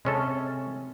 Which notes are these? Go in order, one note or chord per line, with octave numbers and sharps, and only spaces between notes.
C3 G#3 C#4 A4